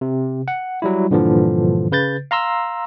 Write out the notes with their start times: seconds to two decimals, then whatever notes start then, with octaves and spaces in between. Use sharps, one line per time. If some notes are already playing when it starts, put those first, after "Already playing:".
0.01 C3
0.48 F#5
0.82 F#3 G3 E4
1.11 G2 A#2 D3 E3 F3
1.92 C#3 B4 G6 A6
2.31 F5 A#5 C6 E6